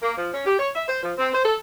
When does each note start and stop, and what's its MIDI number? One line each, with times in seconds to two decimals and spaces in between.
0.02 0.15 58
0.16 0.28 53
0.32 0.45 61
0.46 0.56 67
0.57 0.68 73
0.74 0.84 76
0.87 1.00 72
1.01 1.11 53
1.18 1.28 60
1.32 1.43 72
1.45 1.55 69